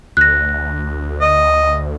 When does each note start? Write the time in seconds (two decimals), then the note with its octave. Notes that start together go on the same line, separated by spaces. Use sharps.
0.17 D2 F#6 A#6
1.21 D#5